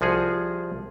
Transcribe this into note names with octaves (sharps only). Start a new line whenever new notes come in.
C2 F3 F#4 G#4